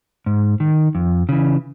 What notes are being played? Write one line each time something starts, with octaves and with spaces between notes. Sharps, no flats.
G#2
D#3
F2
C#3 E3